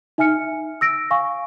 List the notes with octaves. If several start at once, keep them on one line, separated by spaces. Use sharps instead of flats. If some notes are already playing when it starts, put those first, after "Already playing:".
D#4 E5 G#5 F6 C#7
E6 A#6 D7
F5 G#5 C#6